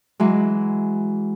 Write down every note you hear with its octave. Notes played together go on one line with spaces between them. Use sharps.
E3 F#3 G#3